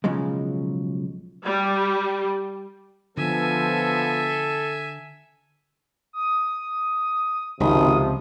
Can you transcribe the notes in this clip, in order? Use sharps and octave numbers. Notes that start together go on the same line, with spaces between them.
B1 C#3 F3 F#3 G#3
G3
D3 F3 B3 A4 E5 G#5
D#6
G#1 C#2 C3 F3 D#6